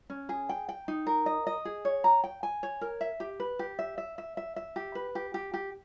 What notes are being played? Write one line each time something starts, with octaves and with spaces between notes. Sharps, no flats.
C#4
G#4
G5
G5
D#4
A#4
D#5
D#5
G#4
C#5
A#5
G5
G#5
C#5
A#4
E5
G4
B4
G4
E5
E5
E5
E5
E5
G4
B4
G4
G4
G4